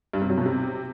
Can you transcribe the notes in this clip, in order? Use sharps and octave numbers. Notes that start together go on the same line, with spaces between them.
G2
C3
F#3
B2
C3